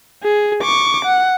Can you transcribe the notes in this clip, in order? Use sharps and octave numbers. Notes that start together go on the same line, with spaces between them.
G#4
C#6 D6
F#5